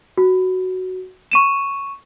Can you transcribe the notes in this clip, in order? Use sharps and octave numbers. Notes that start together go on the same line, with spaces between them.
F#4
C#6 D#7 E7